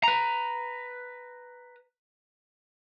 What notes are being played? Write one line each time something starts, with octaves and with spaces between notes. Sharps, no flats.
B4 A#5